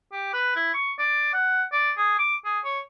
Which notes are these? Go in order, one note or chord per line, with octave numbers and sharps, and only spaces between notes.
G4
B4
E4
C#6
D5
F#5
D5
G#4
D6
G#4
C#5